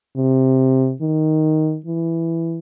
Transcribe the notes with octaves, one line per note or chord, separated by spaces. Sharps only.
C3
D#3
E3